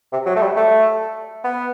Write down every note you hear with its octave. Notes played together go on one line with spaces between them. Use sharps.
C3
F#3
A3
G3
A3
B3